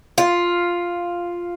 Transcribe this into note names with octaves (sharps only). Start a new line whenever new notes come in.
F4